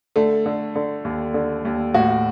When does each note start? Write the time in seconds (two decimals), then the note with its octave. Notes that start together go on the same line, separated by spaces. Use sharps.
0.16 D3 A3
0.46 D3
0.75 D3
1.05 D#2
1.34 D3
1.65 D#2
1.94 A2 F#4